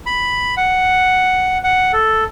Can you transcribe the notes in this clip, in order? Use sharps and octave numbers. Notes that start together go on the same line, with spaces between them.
B5
F#5
F#5
A4